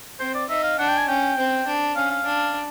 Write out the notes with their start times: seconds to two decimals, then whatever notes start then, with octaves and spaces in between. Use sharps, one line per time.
0.20 C4 C5
0.35 D5
0.49 D#4 E5
0.64 F5
0.79 D4 F#5
0.88 G5
0.98 G#5
1.08 C#4 G5
1.37 C4
1.66 D4
1.96 C#4 F5
2.11 F5
2.25 D4